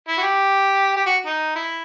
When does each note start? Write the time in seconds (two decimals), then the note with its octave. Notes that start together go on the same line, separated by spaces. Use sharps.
0.08 E4
0.18 F#4
0.23 G4
0.96 G4
1.06 F#4
1.26 D#4
1.56 E4